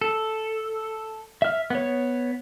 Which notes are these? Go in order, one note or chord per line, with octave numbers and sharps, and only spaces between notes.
A4
E5 F6
B3 C#5